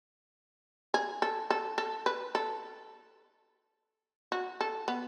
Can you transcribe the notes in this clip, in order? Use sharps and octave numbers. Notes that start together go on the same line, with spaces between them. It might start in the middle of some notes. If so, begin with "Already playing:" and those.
G#4
A4
A4
A4
B4
A4
F#4
A4
B3